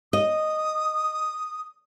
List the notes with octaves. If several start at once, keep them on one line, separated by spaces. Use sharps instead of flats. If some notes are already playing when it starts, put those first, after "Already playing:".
D#5 D#6